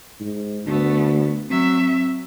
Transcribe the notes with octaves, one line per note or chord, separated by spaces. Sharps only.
G#2
D2 A3 B3
F#3 C4 E5